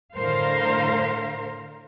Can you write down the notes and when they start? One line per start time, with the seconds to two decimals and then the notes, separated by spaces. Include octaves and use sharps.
0.14 A2 D3 A#4 C5 F5